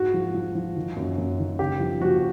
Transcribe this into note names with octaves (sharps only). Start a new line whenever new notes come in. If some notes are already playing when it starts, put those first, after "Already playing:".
Already playing: G#2 F#4
F3
F3
F3
D#3
F#2
F#2
D#3
C#3 G4
F3
F3 F#4